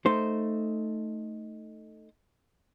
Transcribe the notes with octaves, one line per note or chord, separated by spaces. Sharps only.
A3 D#4 C5